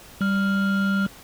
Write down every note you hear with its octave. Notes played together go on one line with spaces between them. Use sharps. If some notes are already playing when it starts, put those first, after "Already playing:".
G3 F6